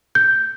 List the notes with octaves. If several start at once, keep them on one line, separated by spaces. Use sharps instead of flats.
G6